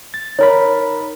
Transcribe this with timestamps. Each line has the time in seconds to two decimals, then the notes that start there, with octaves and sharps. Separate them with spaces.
0.14 A6
0.39 D#4 A#4 C#5 B5